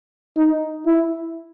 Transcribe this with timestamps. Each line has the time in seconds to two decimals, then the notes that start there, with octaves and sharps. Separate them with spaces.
0.37 D#4
0.86 E4